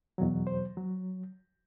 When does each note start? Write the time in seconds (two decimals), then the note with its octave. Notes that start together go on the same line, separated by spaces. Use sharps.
0.18 E2 B2 F#3
0.47 C5
0.77 F#3